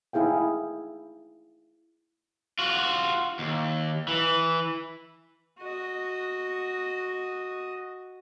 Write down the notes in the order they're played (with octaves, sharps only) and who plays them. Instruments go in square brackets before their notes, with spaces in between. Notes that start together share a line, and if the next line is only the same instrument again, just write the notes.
[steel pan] D#4 E4 G#4 F5 G5
[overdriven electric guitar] F4 F#4
D#2
E3
[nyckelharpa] F#4 D#5